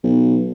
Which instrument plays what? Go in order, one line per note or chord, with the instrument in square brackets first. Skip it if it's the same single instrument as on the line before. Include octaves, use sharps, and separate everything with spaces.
[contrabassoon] B1